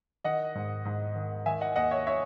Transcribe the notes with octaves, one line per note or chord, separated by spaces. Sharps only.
D#3 D#5 F#5
G#2
G#2
D#3
D#3 E5 G#5
D#5 F#5
D#2 D#5 F#5
C#5 E5
C#5 E5